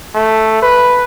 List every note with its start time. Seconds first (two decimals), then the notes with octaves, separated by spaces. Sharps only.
0.15 A3
0.62 B4